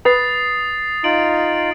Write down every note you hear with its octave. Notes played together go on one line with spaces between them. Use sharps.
B4 D#6 A6 C7
D#4 F4 D7 F#7